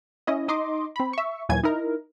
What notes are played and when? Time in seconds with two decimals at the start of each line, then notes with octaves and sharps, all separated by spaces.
0.27 C#4 E4 D#5
0.48 D#4 D#5 C6 D6
0.96 C4 B5
1.13 E5 C#6
1.49 D#2 A#2 E3 F#3 G#5 G#6
1.63 D#4 E4 A#4